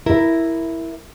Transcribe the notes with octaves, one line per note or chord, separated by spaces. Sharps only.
E4 A#4